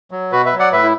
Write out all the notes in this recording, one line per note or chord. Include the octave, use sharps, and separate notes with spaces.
F#3
B2 F#4 B4
B4 E5
F#3
D5 F#5
A2 B4 E5
E4